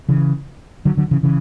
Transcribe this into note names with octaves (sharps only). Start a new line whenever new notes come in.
C#3 E3
D3 F#3
D3 F#3
C#3 E3
C#3 E3